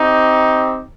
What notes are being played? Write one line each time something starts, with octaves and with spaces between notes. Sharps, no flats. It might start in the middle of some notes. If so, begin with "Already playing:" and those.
Already playing: C4 D#4 G4